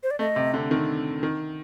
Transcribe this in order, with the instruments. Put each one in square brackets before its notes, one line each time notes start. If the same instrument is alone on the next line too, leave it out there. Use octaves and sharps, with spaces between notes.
[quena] C5
D5
[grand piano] A3 [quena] D#5
[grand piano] C3
D3
D#3
D#3